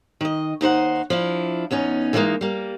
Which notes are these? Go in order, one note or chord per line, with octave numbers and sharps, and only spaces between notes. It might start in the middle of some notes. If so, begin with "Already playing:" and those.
D#3 D#5
D#2 D#4 C5 F#5
F3 D4 E4
E2 B3 C#4 D#4
D3 E3 G3 G#3 A#3 D#4
G3 A#3